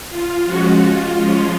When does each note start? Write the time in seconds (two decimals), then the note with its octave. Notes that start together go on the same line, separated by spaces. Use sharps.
0.10 F4
0.45 F3 G#3 C#4 F#4
0.82 F4
1.17 F3 G#3 C#4